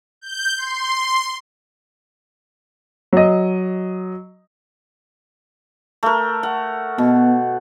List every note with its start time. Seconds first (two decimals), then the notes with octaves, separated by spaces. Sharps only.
0.21 G6
0.56 C6
3.13 F#3 D#5
6.03 A3 A#4
6.43 F#5
6.98 B2 B3